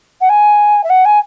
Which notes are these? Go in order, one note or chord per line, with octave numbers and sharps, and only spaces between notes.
F#5
G#5
E5
F#5
G#5